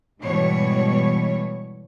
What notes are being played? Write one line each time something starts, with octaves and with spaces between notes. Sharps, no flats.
G#2 B2 E3 G3 C#5